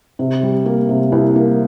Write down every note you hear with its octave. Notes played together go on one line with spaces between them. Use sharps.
C3
G3
A#3
C3
C2
A#3